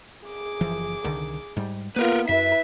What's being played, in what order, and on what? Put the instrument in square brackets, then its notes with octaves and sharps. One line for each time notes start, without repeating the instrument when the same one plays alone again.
[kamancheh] G#4 D6
[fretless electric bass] F#1 E3 F3
C2 D3 D#3
G#2 G3
[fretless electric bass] A#3 [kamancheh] B3 F4 [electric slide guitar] A#4 B4
[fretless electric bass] F#2 [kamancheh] E4 B4 [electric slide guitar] E5